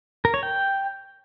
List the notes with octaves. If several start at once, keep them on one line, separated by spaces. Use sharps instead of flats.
A#4
C#5
G5